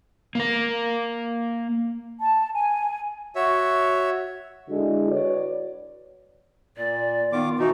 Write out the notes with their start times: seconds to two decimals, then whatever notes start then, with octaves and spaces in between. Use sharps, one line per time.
0.35 A#3 A#4
2.19 A5
2.53 G#5
3.35 F#4 C#5 E5
4.70 D3 G#3 D4 E4 F#4
5.10 F#4 B4 C#5 D5
6.77 A#2 D5
7.32 D#3 B3 F4 D6
7.59 B2 E3 D#4 F#4